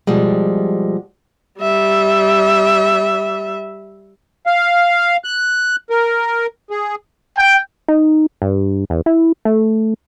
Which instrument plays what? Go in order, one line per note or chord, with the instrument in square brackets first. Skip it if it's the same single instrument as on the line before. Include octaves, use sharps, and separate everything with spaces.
[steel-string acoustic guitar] B2 F3 G3 G#3
[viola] G3 E5
[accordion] F5
F#6
A#4
G#4
[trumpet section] G5
[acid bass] D#4
G2
E2
E4
A3